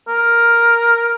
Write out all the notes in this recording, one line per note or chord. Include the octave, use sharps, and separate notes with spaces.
A#4